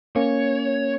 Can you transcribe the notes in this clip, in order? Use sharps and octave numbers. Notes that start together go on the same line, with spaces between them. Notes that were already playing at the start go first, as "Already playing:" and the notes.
A#3 C#4 C#5